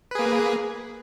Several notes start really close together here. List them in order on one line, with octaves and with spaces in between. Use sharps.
B4 G#4 A#3